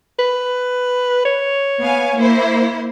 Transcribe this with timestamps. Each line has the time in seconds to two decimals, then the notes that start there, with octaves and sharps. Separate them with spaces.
0.19 B4
1.25 C#5
1.80 B3 F5 G#5
2.17 A#3 E4 C5